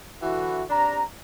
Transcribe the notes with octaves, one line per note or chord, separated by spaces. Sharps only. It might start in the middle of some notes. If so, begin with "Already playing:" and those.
D3 E3 E4 F#4
C3 D4 A#5